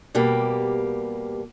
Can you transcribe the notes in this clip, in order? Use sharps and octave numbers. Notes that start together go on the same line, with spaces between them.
B2 G3 A#3 G4